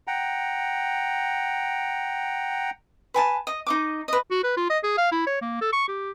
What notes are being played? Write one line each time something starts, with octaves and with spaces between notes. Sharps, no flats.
F#5 G5 A#5
B4 G#5 A5
D#5
D#4 D#5 D6
B4 D#5
F#4
B4
F4
D#5
G#4
F5
E4
C#5
A#3
A4
C#6
G4